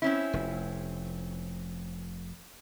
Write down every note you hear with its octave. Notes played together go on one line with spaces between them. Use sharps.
C4 C#4 E4
F1